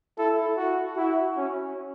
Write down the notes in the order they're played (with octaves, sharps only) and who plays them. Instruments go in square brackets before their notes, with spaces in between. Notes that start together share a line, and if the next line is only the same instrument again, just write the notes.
[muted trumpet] E4 [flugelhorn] A4
[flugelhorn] F#4
[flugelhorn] E4 [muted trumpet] F#4
[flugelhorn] C#4